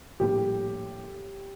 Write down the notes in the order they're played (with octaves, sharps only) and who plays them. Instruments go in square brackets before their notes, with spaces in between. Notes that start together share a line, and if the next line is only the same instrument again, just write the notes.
[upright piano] A#1 A2 G3 A#3 G4